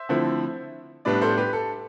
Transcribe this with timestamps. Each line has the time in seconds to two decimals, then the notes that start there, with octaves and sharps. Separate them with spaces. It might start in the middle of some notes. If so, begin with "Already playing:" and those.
Already playing: C5 E5
0.09 D3 F3 A3 C4 E4
1.05 A2 G3 B3 D4 B4 D5
1.21 A4 C5
1.37 G4 B4
1.53 A4